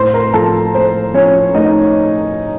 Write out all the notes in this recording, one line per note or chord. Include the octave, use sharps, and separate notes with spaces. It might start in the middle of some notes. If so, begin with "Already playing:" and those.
Already playing: A2 C5 C6
A#4 A#5
F3 A4 A5
A3 C5
F3 C#4 C#5
A3 D#4 D#5